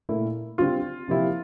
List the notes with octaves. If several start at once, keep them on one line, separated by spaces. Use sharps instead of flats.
A#2 A3 E4 A#4
D3 G3 C4 F4
C3 F3 A#3 E4 G4